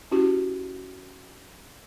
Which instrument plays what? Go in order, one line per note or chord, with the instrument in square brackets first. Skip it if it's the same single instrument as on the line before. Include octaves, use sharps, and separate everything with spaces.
[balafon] C#4 E4 F#4 G4